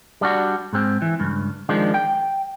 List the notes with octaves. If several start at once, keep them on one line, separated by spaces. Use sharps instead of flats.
G3 D4 F#4
G#2 C4
E3
C#2 G2
D#3 F3 G#3 D4
G5